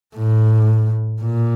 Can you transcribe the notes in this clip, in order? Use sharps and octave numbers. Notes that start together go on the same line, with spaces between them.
A2
A#2